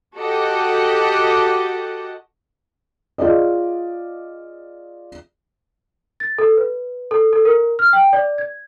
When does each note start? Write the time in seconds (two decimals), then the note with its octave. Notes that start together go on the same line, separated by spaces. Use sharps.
0.17 F#4 G4 A4 D#5 F#5
3.18 F4 G#4 D5 D#5
6.20 A6
6.38 A4
6.57 B4
7.11 A4
7.33 A4
7.45 A#4
7.79 F6
7.93 G5
8.13 D5
8.38 G#6